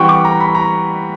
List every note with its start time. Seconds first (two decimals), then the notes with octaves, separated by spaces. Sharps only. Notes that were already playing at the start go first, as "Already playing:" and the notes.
Already playing: E3 G3 C4 F#5 G5 C#6
0.09 D6
0.25 A#5
0.40 B5
0.55 A#5